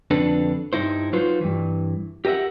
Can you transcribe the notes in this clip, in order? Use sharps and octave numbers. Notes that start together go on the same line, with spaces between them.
F2 D3 D4 A4 B4
G2 D#4 E4 C5
F#3 D#4 F4 B4 C5
G2 E3
G4 A#4 D#5 E5 F#5